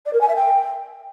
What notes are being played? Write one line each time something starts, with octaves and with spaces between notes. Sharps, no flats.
D5
A#4
G#5
E5
G5